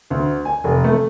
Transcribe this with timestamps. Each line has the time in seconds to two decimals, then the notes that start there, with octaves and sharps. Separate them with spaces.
0.10 D2
0.45 G#5
0.64 F1
0.84 A3